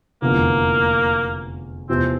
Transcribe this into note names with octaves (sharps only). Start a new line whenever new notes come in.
F1 E2 D3 A#3
E2 C3 F3 C4